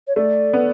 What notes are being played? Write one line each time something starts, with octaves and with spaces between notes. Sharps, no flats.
C#5
A3 D5
B3